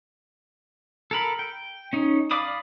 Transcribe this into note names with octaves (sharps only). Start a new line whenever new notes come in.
A4 A#4 B5
G5
C#4 D#4
D5 F5 B5 D6 D#6